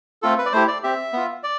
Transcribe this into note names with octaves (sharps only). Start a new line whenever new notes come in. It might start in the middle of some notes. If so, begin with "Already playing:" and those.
A3 C4 F4 A4
B4
D5
A3 E4 G4 C5
D5
C4 G4 E5
B3 F4
D5